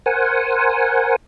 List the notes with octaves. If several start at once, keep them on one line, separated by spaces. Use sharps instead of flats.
A#4 C5 F#5 G#5